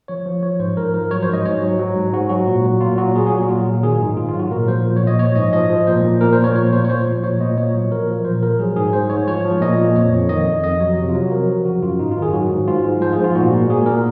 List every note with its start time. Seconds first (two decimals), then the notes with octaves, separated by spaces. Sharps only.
0.08 F3 C#5
0.26 F3
0.42 F3 C#5
0.59 G#2 C5
0.76 G#2 A#4
0.94 F3 A#4
1.10 F#3 C#5
1.22 C5
1.29 G#2 D#5
1.46 G#2 C#5
1.62 F#3
1.79 F#3
1.95 G#2
2.13 G#2 F#4
2.29 F#3 F#4
2.47 A#2
2.64 F#3
2.81 A#2 F4
2.98 F#3 F#4
3.15 F#3 G#4
3.27 G#4
3.32 A#2 F#4
3.43 F#4
3.48 F#3 F4
3.66 A#2
3.83 D#3 G#4
4.00 G#2 D#4
4.17 G#2 F4
4.29 F4
4.34 F#3 F#4
4.51 A#2 A#4
4.68 F3 C5
4.85 A#2
4.96 C#5
5.02 A#2
5.07 D#5
5.19 F3 C#5
5.36 G#2 D#5
5.53 F3 D#5
5.70 F3
5.87 A#2 C5
6.04 A#2
6.21 A#2 A#4
6.33 C5
6.38 F3
6.44 C#5
6.55 A#2 C#5
6.73 A#2 C5
6.85 C#5
6.89 A#2 C5
7.06 F3
7.24 A#2 C#5
7.40 A#2 D#5
7.57 A#2 C#5
7.75 F#3
7.91 F3 A#4
8.08 F3
8.25 A#2 C5
8.43 F3 A#4
8.59 F#3 G#4
8.76 G#2 G#4
8.93 G#2 C5
9.10 G#2 C#5
9.28 F3 C#5
9.45 F3
9.61 A#2 D#5
9.78 A#2
9.96 F2 C#5
10.12 F2
10.29 D#3 D#5
10.46 F2
10.64 F2 D#5
10.80 F#3 C#5
10.98 C3
11.09 F4
11.15 F#3
11.20 F#4
11.31 F3 A#4
11.49 F3
11.65 C#3 F#4
11.83 F#2 F4
11.99 G#2 D#4
12.11 F4
12.17 D#3
12.22 G#4
12.33 F#3 F#4
12.50 G#2
12.68 G#2 F4
12.84 G#2
13.02 F3 C5
13.13 G#4
13.18 G#2
13.24 F4
13.35 A#2 F#4
13.52 A#2
13.70 A#2 G#4
13.86 A#2 A#4